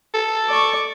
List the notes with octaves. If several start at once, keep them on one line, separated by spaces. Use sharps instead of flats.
A4
D5 C#6